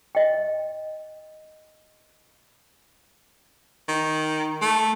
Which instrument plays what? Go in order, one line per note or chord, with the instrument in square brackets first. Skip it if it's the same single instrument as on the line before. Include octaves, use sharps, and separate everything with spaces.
[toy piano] D#5 G5
[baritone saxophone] D#3
A3